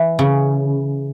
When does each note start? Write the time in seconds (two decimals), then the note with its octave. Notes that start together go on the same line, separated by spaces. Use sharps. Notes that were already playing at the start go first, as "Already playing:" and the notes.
Already playing: E3
0.19 C#3